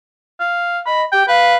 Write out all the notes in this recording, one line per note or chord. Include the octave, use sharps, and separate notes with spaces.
F5
D#5 B5
G4 G5
B4 F5